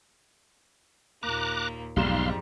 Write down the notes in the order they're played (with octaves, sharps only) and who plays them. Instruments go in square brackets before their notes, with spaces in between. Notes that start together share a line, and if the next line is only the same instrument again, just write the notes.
[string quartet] D#2 A#2 A#3 [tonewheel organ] A#5 D6 F#6
[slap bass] B1 [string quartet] F2 G3 [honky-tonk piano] G#2 E7 [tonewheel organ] F5 C6